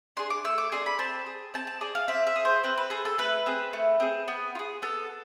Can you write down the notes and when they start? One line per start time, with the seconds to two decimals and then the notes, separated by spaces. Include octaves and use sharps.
0.17 D4 G#4 C6
0.30 D6
0.44 A3 E6
0.58 D6
0.72 D4 G#4 C6
0.86 B5
0.99 C4 A5
1.26 G#4
1.54 C4 A5
1.67 A5
1.81 G#4 D5
1.95 F5
2.08 C4 E5
2.27 E5
2.36 G#4
2.45 C5
2.64 C4 B4
2.78 B4
2.90 G#4 A4
3.05 A4
3.18 A3 B4
3.46 C4 G#4
3.73 A3
4.00 C4 G#4
4.28 B3
4.55 F4
4.59 G#4
4.82 B3 A4